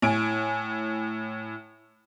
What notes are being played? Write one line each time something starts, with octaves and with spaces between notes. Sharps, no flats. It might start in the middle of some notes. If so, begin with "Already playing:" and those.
A2 G#5 D7